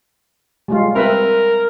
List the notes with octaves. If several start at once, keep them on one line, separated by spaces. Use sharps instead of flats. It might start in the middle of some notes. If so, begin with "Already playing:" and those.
G3 G#3 F4
C4 A#4 B4 E5